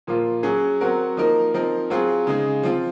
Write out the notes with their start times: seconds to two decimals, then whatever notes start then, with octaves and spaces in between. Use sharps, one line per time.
0.07 A#2 F3 A#3 F4
0.43 F#3 C#4 G#4
0.81 F#3 C4 F#4 A#4
1.17 F3 A#3 D#4 A#4
1.54 F3 C4 D#4 A#4
1.90 F#3 C4 F4 G#4
2.27 C#3 G#3 D#4 G#4
2.63 F3 C4 F4